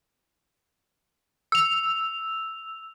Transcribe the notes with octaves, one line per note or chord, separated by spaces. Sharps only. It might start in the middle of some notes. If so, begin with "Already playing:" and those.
E6 F7